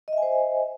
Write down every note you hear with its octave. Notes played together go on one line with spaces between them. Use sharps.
C5 D#5 E5 G#5